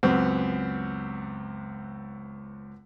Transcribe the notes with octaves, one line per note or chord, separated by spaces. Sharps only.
C#2 F#2 B3 C4